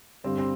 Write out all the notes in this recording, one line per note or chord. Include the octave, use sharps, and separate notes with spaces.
G2 D3 G3 C4
C4